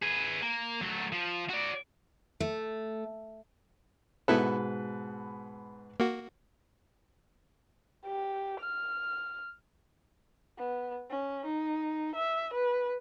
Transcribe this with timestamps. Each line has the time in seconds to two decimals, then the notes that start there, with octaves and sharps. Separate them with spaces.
0.02 G#4 B4
0.42 A#3
0.82 F#3 A3
1.12 F3
1.49 F#4 D5
2.40 A3
4.28 G#2 B2 B3 E4 A4 B4
6.00 A#3 F#4
8.06 G4
8.61 F6
10.58 B3
11.10 C#4
11.45 D#4
12.16 E5
12.53 B4